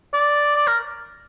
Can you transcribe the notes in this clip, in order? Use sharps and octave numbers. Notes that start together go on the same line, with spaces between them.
D5
D5
A#4